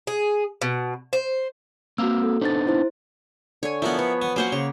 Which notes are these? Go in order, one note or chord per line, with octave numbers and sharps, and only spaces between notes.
G#4
B2
C5
A#3 C4 F#4 F5 E6
A4
B3 D4 D#4 C5 A6
E4 C5
D3 C#5 G#5
F3 B3 E4 A#4 F#5
B4 C#5
B3 C#6 D#6
F#3 A#3 C#4 C5 F#5
C#3 C#5